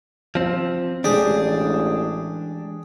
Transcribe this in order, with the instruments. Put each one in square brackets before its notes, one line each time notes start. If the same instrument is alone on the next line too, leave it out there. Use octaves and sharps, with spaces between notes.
[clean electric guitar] F3 C4
[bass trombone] A1 [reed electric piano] E3 G#3 [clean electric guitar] D4 [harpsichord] G4 G#4